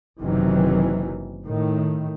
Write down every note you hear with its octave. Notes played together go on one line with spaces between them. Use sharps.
F#1 C3 D#3 E3 F#3
A2 D#3